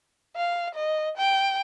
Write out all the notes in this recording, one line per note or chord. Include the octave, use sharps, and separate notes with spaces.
F5
D#5
G5